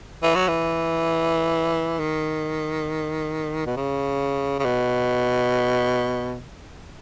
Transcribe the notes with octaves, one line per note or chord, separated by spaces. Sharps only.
E3
F#3
E3
D#3
B2
C#3
C#3
B2